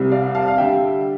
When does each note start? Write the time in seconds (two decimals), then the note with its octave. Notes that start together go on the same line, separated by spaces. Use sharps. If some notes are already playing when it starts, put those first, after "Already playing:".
Already playing: C2 C3 G3
0.12 D5 F5
0.35 F5 A5
0.48 F5
0.58 D3 G3 E5 G5